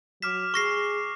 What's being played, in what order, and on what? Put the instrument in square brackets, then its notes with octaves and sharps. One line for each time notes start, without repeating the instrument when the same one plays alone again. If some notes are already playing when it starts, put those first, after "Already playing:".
[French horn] F#3 [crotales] D6 F6 E7 [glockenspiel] B6
[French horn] G#4 [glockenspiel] C#6 A#6 C7